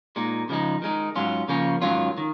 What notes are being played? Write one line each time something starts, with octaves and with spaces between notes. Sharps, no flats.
A#2 G#3 D#4
C#3 F3 G#3 D#4
D#3 G#3 D#4
G#2 F#3 C#4 F4
C#3 F3 A#3 C#4
G#2 D#3 F#3 C#4 F4
D#3